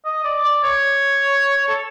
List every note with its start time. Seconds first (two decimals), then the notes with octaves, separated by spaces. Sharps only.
0.05 D#5
0.24 D5
0.44 D5
0.63 C#5
1.69 A4